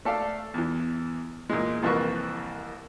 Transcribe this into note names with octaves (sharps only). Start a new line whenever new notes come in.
A3 A4 D5 F5
E2 E3
A#2 E3 G#3
C2 F2 E3 A#3 B4 C#6